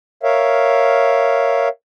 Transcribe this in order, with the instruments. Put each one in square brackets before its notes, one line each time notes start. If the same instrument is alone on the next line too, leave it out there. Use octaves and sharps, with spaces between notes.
[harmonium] A#4 C#5 E5 F5